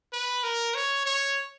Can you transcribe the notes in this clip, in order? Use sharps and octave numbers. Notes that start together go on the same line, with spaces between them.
B4
A#4
C#5
C#5